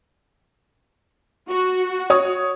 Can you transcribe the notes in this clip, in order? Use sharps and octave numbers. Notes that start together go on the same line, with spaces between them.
F#4
C#5 D#6